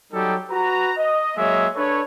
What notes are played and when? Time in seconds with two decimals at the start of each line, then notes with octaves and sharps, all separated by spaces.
0.13 F#3 G3 D#4 G4 A4
0.50 F#4 B4 A#5
0.97 D#5
1.37 F#3 G#3 A#3 C#5 E5
1.75 D4 A4 B4 C#5